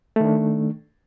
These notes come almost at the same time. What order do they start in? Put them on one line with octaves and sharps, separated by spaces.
A3 D#3 D4